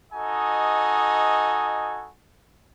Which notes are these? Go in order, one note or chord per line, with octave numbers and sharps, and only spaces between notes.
D#4 F#4 A4 D#5 G#5